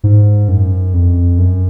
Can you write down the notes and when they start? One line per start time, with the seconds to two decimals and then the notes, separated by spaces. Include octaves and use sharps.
0.04 G#2
0.48 F#2
0.93 F2
1.39 F#2